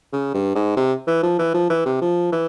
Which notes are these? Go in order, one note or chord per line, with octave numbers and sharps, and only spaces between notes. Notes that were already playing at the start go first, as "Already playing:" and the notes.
C#3
G2
G#2
C3
E3
F3
E3
F3
E3
C3
F3
E3